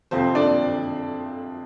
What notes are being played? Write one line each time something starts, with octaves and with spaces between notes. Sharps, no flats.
F2 C3 F3 C4 C5
D4 D5